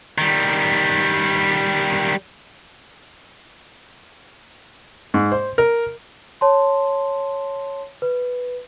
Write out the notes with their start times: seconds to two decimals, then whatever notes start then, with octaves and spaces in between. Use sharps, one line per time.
0.18 D#3 G3
5.14 G#2
5.32 C5
5.58 A#4
6.41 C#5 A5 C6
8.02 B4